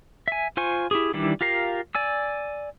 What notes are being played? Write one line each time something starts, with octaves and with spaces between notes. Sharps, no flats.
E5 G#5
F4 C5 G#5 C#6
E4 G4 G#4
D#3 E3 G3 D4 E4
F4 G4 A#4 F5 A#5
D5 G#5 E6